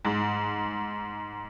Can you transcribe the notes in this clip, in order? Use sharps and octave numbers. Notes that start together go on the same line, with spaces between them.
G#2